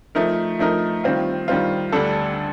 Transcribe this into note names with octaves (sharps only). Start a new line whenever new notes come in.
F3 A3 D#4 A#4
F3 A3 D#4 A#4
D#3 G3 C4 F4
D#3 G3 C4 F4
D2 D3 G3 D4 A4